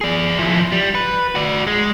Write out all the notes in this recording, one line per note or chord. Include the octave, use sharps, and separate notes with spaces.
G#4 D5
F3 E4
G3
B4
F#4 D5
G#3